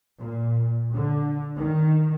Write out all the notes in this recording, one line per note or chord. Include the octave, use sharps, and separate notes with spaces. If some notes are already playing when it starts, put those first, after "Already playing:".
A#2
D3
D#3